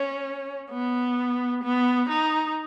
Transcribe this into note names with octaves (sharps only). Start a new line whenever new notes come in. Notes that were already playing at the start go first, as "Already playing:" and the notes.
Already playing: C#4
B3
B3
D#4